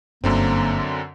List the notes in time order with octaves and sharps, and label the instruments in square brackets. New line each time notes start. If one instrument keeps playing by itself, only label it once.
[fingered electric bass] G1 [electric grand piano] F#2 D3 C4 [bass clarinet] A#3